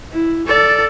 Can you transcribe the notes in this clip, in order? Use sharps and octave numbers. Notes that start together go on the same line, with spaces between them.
E4
A4 D5